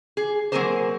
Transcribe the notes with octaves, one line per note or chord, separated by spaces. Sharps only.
G#4
F#3 A#3 C4 G#4 A#4 C5